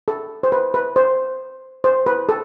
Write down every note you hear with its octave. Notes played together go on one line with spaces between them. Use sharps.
A4
C5
B4
B4
C5
C5
B4
A4